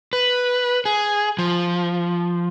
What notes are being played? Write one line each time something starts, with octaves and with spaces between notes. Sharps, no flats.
B4
G#4
F3